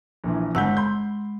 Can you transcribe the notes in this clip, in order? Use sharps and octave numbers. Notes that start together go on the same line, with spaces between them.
A#1 A#2 E3
G1 G#3 F#5 E6 G6
B5 C6 G6